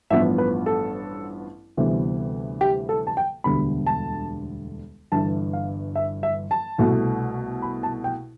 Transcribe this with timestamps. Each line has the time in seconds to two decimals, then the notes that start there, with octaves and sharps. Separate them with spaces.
0.10 A1 G2 F3 B3 E5
0.38 B4
0.66 A4
1.77 D2 C3 E3 G3 B3
2.61 G4
2.89 A4
3.07 A5
3.17 G5
3.44 E1 D2 D3 G3 B3 B5
3.87 A5
5.12 G1 G2 E3 A5
5.53 F5
5.95 E5
6.23 E5
6.51 A5
6.78 C2 B2 A3
7.62 B5
7.83 A5
8.04 G5